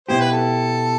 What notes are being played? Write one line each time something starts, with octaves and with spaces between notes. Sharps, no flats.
B2 B3 E4 G4 C5
B4
A4